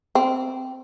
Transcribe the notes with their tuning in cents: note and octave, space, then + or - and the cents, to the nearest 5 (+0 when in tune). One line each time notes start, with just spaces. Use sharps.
C4 -10